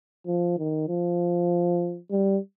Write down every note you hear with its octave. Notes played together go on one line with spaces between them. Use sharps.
F3
D#3
F3
G3